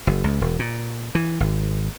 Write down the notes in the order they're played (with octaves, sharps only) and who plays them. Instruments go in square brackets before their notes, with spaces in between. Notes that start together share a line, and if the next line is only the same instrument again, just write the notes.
[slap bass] F#1
C#2
E1
A#2
E3
G#1